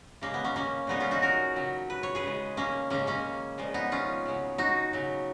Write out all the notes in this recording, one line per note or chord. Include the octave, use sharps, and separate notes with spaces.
C#3 G#3 A#3
B3
A#3 C#4
A#3 C#4
A#2 F3 G#3 B3 D#4
C#4 F4
D#4 F#4
F#4 A#4
C#3 F#3
B4
C#5
G#4 B4
C#3 G#3
A#3 C#4
C#3 G#3 A#3 C#4
A#3 C#4
A#2 F3 G#3
B3 D#4
C#4 F4
C#3 F#3
D#4 F#4
C#3 F#3